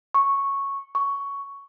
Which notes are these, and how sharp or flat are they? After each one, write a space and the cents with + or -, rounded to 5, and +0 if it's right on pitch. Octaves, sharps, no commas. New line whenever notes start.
C#6 -5
C#6 +10